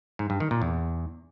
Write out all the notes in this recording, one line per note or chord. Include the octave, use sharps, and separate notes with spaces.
G#2
G2
D#3
A#2
E2